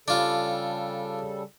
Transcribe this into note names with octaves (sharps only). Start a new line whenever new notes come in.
C#3 G3 D4 F4 A4